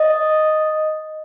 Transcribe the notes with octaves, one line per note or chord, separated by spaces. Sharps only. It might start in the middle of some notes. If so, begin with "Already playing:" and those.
Already playing: D#5